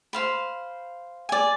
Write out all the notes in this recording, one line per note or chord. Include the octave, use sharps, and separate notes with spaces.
C5 F5 B5
D5 G#5